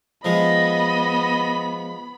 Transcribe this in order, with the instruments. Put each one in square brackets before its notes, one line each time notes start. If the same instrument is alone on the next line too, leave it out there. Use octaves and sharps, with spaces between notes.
[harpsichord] F3 G#3 [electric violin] B3 B5 [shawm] D#5